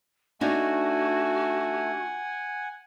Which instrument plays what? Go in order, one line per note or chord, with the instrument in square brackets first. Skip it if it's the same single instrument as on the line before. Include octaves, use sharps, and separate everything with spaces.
[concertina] A3 [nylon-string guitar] D4 D#4 [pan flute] F#4 [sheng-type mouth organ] F#5 G#5